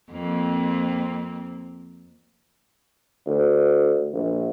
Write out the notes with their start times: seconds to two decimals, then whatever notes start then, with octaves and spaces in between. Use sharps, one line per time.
0.10 F2 A#3 C4
3.27 D2
4.13 A#1